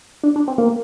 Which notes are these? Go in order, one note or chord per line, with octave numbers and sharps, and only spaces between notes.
D4
D4
C4
A#3